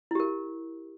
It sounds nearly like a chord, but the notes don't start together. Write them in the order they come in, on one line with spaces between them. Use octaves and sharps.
E4 G4 A#4